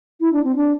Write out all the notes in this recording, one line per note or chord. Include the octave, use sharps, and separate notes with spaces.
E4
D4
C4
D4